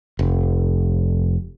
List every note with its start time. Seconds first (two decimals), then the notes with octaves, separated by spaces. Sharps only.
0.19 F1